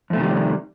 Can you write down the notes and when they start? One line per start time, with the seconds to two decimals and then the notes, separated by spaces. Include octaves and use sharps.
0.10 F2
0.13 A3
0.16 C3
0.20 D#3
0.23 G3